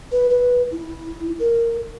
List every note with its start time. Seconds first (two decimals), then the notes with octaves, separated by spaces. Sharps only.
0.12 B4
0.30 B4
0.72 E4
1.40 A#4